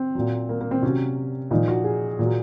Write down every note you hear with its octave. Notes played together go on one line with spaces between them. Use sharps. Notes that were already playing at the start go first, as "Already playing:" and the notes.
Already playing: C4
A#2 F#3
A#3
A#3
C4
C3 F#3 C#4
A#2 F3 D#4
F#4
G#4
A#2 F#3